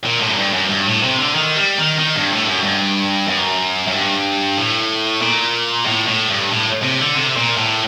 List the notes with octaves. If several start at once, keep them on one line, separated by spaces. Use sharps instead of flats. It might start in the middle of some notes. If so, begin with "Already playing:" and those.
A#2
A2
F#2
G2
F#2
G2
A2
C3
D3
D#3
G3
D#3
D#3
G2
A2
F#2
G2
F#2
F#2
G2
A2
A#2
A2
A2
G2
A2
C3
D3
C3
A#2
A2